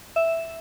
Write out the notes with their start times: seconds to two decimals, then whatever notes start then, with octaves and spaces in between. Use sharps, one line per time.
0.16 E5